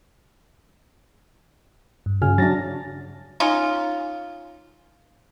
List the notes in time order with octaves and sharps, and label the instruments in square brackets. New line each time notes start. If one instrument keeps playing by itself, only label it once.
[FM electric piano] G2
[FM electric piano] G2 G#5 F6 [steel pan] C#3
[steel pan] F#3 D4 [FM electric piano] A6 A#6
[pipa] C#4 D#4 F4